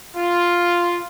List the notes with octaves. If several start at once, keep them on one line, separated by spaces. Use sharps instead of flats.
F4